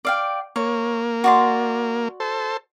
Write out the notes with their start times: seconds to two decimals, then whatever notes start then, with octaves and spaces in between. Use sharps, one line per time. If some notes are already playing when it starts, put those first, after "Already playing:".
0.05 D5 F5 G5
0.56 A#3 C#5
1.24 F#4 D5 C6
2.20 A4 C5